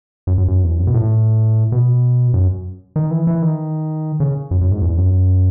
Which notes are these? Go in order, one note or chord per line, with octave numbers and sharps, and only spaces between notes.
F#2
F#2
F#2
E2
F#2
B2
A2
B2
F#2
D#3
E3
E3
D#3
C#3
F#2
F#2
G#2
E2
F#2